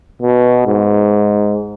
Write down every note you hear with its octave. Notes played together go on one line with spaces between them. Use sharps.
B2
G#2